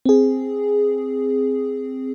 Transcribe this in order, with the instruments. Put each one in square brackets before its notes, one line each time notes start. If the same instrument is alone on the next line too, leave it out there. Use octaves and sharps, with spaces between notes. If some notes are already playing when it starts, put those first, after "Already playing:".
[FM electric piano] C4 G#4